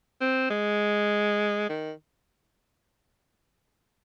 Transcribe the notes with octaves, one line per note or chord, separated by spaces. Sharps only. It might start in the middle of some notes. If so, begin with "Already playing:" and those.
C4
G#3
D#3